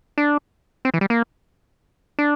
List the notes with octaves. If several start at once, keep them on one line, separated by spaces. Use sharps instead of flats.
D4
C4
E3
G3
A#3
D4